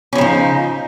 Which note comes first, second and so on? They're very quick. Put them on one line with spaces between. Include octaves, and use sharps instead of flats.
C#4 F3 C#3 D#4